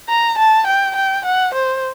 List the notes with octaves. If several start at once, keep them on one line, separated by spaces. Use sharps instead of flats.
A#5
A5
G5
G5
F#5
C5